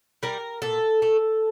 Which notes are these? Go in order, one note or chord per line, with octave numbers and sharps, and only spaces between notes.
G3 A#4
A#2 A4
A3